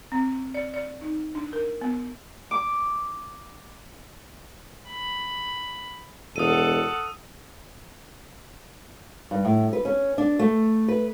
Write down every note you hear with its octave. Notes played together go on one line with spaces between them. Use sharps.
C4
D5
D5
D#4
D4
A#4
B3
D6
B5
E1 A4 F#5 D#6 D#7
G2
A2
B4
C#4
D4
A3
B4